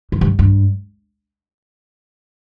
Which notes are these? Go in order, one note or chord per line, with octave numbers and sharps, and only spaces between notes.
F#2
G2
G2